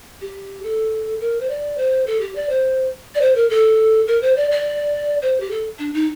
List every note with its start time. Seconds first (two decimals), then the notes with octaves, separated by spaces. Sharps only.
0.21 G4
0.64 A4
1.21 A#4
1.41 C5
1.50 D5
1.78 C5
2.07 A4
2.21 G4
2.35 D5
2.49 C5
3.15 D5
3.21 C5
3.35 A#4
3.50 A4
4.07 A#4
4.22 C5
4.37 D5
4.51 D5
5.22 C5
5.40 G4
5.50 A4
5.79 D4
5.94 D#4